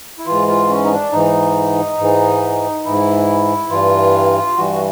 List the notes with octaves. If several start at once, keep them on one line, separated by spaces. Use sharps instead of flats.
E4
G#2 E3 F4
F4
C#4
D#4
D4
G#2 E3 D#4
G#2 E3
G#2 E3 E4
G2 E3 F4
G2 E3 F#4